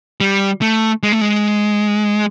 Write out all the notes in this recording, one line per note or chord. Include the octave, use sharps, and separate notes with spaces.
G3
A3
G#3
A3
G#3